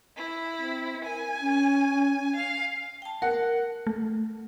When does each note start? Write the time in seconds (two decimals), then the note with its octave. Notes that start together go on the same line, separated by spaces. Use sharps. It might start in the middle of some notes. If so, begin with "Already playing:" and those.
0.17 E4
0.59 C4
1.05 A#4 G#5
1.40 C#4
2.36 F5
3.02 G5 A5
3.22 A#4 F#5
3.87 A3